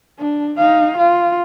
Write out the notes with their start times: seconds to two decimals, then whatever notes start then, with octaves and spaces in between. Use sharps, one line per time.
0.19 D4
0.58 D#4 F5
0.97 F4